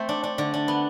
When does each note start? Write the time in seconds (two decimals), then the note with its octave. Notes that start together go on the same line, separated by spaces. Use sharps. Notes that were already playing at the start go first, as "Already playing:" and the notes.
Already playing: A3 C4
0.09 D4
0.23 D4
0.38 D3
0.54 D4
0.68 B3